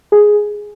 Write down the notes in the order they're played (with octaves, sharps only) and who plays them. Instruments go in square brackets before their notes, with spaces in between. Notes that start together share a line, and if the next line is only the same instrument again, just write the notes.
[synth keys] G#4